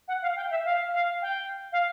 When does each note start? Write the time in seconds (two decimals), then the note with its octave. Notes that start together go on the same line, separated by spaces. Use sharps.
0.08 F#5
0.22 F5
0.36 G5
0.51 E5
0.65 F5
0.94 F5
1.22 G5
1.72 F5